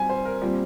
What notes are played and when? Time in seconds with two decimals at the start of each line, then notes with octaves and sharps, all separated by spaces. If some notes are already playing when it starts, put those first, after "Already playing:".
Already playing: G3 C4 G#5
0.09 C5
0.25 A#4
0.41 A#2 G3 C4